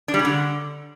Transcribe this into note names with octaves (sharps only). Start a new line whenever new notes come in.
D4
G3
C#3
D3